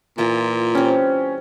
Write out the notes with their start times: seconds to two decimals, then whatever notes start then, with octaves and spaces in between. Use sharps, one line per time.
0.18 A#2 E3 F4 A#5
0.75 G3 C4 C#4